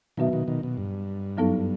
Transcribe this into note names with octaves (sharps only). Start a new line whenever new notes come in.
B2 D#3 F#3 B3 F#4 B4 E5
B2 D#3
B2 D#3
B2
G2
F#2 F#3 B3 D#4 A4